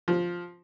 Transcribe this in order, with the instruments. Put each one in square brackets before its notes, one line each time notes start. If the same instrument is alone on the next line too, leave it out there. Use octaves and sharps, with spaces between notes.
[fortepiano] F3